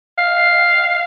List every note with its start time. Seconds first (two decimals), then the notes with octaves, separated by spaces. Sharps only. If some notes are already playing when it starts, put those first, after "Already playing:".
0.18 F5